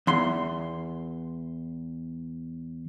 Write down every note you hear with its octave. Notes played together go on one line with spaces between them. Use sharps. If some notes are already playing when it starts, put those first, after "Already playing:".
E2 C6